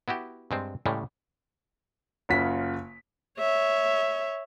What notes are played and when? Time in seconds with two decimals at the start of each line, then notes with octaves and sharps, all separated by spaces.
0.08 B3 E4 F#4 G4
0.51 G2 G#3 C4
0.86 A2 C#3 G3 G#3
2.29 F#1 C#3 F4 F#5 B6
3.39 C#5 E5